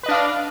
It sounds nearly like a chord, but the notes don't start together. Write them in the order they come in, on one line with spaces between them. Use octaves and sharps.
B4 D#5 D4 F5 D5